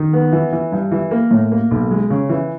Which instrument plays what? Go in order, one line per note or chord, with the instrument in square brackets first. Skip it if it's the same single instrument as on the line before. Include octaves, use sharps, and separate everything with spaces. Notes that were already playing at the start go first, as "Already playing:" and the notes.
Already playing: [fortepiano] D#3
B3
E3
E3
G2
E3
A#3
A2
A#3
B1
G#3
C#3
E3